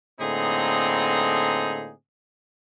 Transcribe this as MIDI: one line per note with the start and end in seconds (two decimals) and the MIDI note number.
0.20 1.92 45
0.20 1.92 50
0.20 1.92 58
0.20 1.92 60
0.20 1.92 63
0.20 1.92 68